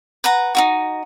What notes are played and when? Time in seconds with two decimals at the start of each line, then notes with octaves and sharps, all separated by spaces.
0.24 B4 F#5 A#5
0.55 D#4 E4 F#4